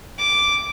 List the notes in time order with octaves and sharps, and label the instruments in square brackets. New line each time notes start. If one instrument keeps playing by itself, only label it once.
[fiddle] D6